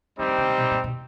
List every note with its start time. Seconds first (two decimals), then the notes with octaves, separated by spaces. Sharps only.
0.18 D#3 G3 C4 D#4 G4
0.28 D3
0.38 C#3
0.48 C3
0.58 B2
0.71 A#2
0.84 B2